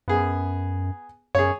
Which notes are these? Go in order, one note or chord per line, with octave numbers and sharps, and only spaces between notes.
F#2 B3 G#4
F#2 G#4 C#5